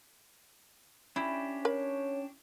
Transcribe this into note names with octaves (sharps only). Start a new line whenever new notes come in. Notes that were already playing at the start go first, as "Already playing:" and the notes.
C#4 D4 E4 G4
A#4 C#5 B5